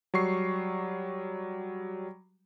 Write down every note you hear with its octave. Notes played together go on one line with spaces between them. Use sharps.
F#3 G3 C#6 C7